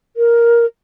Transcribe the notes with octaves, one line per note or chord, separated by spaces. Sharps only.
A#4